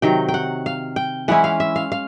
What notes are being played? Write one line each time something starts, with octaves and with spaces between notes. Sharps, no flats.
C3 D#3 F#3 G5
G5
F#5
F5
G5
E3 G#3 C#4 E4 F#5
F5
E5
F5
F5